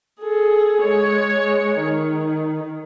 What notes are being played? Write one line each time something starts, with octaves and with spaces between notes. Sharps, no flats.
G#4 A4
G#3 C#5
D#3